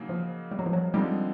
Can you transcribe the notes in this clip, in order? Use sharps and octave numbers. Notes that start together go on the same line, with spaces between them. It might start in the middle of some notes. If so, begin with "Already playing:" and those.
Already playing: C#3 F#3 A#3 D#4
F3
G3
F#3
F3
F#3
D3 F3 G3 G#3 C4 D#4